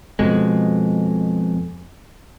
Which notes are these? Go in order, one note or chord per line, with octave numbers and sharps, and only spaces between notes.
F2 B2 G#3